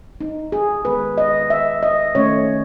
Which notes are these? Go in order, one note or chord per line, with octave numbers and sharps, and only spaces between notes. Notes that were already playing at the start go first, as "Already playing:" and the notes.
D#4
G#4
D#3 G#3 B3 B4
D#5
E5
D#5
D#3 A3 C#4 C#5